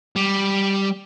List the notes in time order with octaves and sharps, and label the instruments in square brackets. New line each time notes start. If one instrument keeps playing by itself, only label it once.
[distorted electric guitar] G3